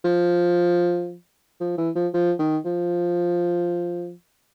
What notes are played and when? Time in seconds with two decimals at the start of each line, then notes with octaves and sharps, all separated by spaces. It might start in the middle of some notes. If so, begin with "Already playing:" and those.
0.04 F3
1.60 F3
1.78 E3
1.95 F3
2.13 F3
2.39 D#3
2.65 F3